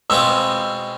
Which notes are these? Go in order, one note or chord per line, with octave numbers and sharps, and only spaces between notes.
B2 G#3 C4 F4 E6